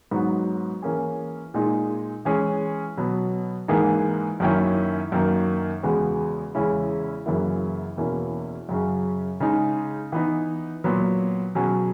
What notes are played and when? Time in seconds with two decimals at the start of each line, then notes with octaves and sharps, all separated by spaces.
0.11 G#2 F#3 B3 D#4 F#4
0.82 E3 A#3 C#4 G#4
1.54 A#2 G#3 D#4 G#4
2.25 E3 G#3 C#4 G#4
2.97 B2 F#3 B3
3.68 G#2 E3 A#3 D#4 G#4
4.40 F#2 D#3 A#3 C#4 E4
5.12 F#2 D#3 A#3
5.83 E2 C#3 G#3 B3 F#4
6.55 E2 C#3 G#3 C#4 E4
7.26 F#2 C#3 E3 A#3 E4
7.97 E2 B2 A#3 C#4 E4
8.69 F#2 C#3 F#3 C#4
9.40 C#3 G#3 D#4 G#4
10.12 E3 B3 D#4
10.84 A#2 F#3 B3
11.55 B2 F#3 C#4 G#4